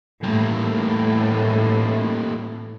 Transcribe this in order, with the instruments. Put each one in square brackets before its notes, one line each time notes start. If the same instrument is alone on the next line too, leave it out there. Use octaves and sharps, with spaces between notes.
[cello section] A2 E3 [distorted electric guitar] G3 A#3